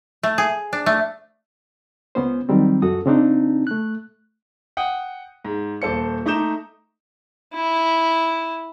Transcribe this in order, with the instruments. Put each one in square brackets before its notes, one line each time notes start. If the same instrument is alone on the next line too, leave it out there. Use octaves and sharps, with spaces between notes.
[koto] A3
G#4
D4
A3
[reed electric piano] C#2 B3 C#4 C5
D#3 F#3 G3 C4
C#2 F#2 F#4 A4 D#6
C#3 C4 D4 D#4
A3 F#6
[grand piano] F#5 G5 D#6
G#2
D#1 A4 C5 C#7
A3 D#4 A#5 D6 G6 E7
[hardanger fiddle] E4